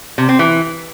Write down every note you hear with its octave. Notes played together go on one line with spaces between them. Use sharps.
C3
C4
E3